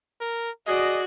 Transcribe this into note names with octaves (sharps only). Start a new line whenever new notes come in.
A#4
F#4 G#4 D5 D#5